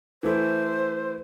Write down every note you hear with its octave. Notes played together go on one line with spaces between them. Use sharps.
E3 A3 E4 C5